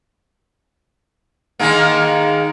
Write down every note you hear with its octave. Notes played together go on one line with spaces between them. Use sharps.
D#3 G#3 A#3